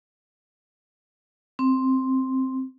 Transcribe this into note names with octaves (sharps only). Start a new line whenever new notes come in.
C4